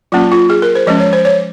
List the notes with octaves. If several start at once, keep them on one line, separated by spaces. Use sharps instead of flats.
F#3 A#3 C#4 F4
F4
G#4
A#4
C5
F3 G#3 C#4 D#5
C#5
C5
C#5